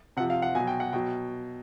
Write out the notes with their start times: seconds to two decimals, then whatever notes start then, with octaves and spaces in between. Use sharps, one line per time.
0.17 C3 F3 F#5
0.30 F5
0.42 F#5
0.55 B2 F#3 G#5
0.67 G5
0.80 F#5
0.93 B2 F#3 G5